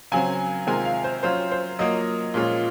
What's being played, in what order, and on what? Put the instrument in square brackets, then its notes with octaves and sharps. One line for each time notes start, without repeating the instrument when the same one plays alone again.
[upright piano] C#3 F#3 C4 G#5
C3 D#3 G#3 C4 F4 G#5
F5
C5
F#3 C#4 F4 C5
C5
F#3 A#3 F4 D#5
A#2 F3 G#3 C#4 F4